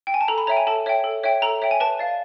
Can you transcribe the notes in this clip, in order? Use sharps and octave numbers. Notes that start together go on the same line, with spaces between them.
G5
G#5
A5
A4 A#5
B5
C#5 E5 G5 A#5
G#5
A4 A5
C#5 E5 G5
A4
C#5 E5 G5
A4 A#5
C#5 E5 G5
G#5
B4 A5
D5 F5